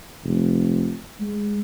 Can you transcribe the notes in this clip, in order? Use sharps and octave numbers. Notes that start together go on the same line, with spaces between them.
F1
G#3